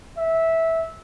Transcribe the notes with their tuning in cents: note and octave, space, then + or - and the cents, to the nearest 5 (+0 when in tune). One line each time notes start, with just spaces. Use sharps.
E5 -10